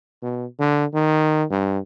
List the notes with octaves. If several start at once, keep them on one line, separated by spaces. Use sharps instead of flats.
B2
D3
D#3
G2